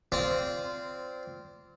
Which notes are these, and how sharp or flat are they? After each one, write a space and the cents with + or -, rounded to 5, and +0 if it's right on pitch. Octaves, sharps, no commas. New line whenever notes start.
C4 -20 F4 -10 D5 -20